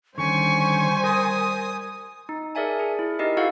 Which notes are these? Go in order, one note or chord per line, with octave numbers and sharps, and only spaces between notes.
D3 D#3 G3 C#4 C5 G#5 C#6
A#4 D#6
D#4
G#4 A#4 D5 E5 G#5 A5
G#4
E4
D#4 G4 A#4 D#5
E4 F#4 G#4 F5 F#5 E6